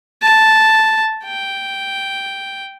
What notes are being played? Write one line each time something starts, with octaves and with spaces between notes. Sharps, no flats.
A5
G5